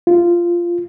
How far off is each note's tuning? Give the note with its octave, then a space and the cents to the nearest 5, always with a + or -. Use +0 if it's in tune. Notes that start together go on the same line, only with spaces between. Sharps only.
F4 -10